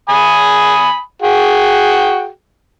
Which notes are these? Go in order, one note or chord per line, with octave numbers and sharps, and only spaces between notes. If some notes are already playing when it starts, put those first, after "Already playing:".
G#5 B5 D#6
F#4 G#4 G5